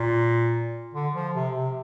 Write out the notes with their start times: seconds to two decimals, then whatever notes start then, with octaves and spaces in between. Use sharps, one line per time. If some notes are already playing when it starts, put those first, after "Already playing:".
Already playing: A#2
0.94 D3
1.14 F3
1.34 C3
1.55 C3